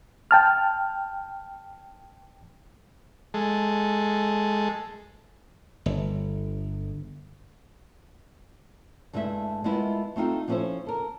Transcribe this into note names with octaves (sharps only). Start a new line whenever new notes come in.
G5 A5 F6
G#3 A4
G1
G2 G#3 A3 E4 F#4 E5
G#3 A3 B3 E4 F4 A#4
A3 C4 D#4 F4 A4
F3 B3 C#4 E4 A4 C5
A4 A#4